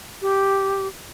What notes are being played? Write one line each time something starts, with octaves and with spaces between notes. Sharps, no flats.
G4